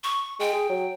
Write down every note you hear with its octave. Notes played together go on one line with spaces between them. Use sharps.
C#6
G#3 G5
G#4
F#3